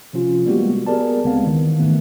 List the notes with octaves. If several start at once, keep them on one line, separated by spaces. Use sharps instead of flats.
C3 F3 C#4 F4
G3 G#3 A#3 B3 F#4 G4
B3 G4 G#4 A#4 D5 A5
D2 C#3 G#3 B3 C4 F5
D#3 E3
G#2 D#3 A3 B3